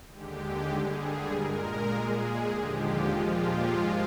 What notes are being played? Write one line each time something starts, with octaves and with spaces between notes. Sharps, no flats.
D#2 D3 G#3 G4
G2 D3 G3 G#4
A#2 G#3 A#4
A#2 G#3 G#4
D#2 D3 F3 G#3 G4
F4
A#2 F3 G#3 F4
G4
G#2 F3 G#3 F4